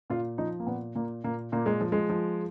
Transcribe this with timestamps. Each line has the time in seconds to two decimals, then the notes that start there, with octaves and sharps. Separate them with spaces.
0.10 A#2 F4
0.38 F3 D#4
0.60 A#3
0.67 A#2 B3
0.95 A#2 A#3
1.24 A#2 A#3
1.52 A#2 A#3
1.66 G#3
1.81 F3
1.92 G#3
2.10 F3